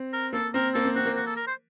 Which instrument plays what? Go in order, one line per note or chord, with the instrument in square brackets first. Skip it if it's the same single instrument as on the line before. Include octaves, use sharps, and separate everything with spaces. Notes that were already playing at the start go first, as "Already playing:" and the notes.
Already playing: [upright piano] C4
[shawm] A#4
[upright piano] A#3 [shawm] A4
[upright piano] C4 [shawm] A#4
[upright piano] A#3 [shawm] A4
[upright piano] C4
[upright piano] C4 [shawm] F#4
[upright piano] A#3
[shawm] F#4
A4
A#4
C5